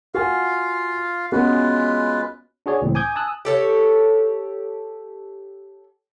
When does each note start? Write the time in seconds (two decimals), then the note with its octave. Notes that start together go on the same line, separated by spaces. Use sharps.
0.14 F4 F#4 F5 F#5 G#5
1.32 G#3 B3 C#4 F4 F#4 B4
2.66 D4 F#4 G#4 C#5 D5
2.82 C#2 A2 E3 C4
2.95 G#5 D6 D#6 G6 G#6
3.15 G#5 A5 D#6 E6 F#6
3.45 G4 A4 C#5